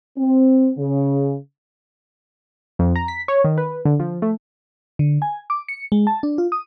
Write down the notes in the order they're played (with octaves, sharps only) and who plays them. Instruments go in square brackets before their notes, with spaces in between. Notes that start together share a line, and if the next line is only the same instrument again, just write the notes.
[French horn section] C4
C#3
[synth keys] F2
A#5
B6
C#5
D#3
B4
D3
F3
A3
[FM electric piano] D3
G#5
D6
C#7
G#3
A5
D4
F4
D#6